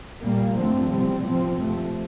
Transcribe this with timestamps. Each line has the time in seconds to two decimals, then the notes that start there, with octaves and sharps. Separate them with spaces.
0.22 A#2 G3 A#3
0.57 G2 D3 F3 A3 C4
0.90 E2 C3 G3 C4
1.23 A2 F3 C4
1.57 F2 C3 F3 A3